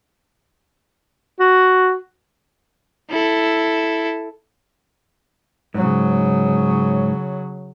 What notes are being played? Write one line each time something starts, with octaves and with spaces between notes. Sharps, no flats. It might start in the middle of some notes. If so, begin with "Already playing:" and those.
F#4
E4 A4
G#2 C#3 F#3